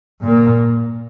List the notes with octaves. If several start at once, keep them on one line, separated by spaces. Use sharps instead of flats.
A#2 A#3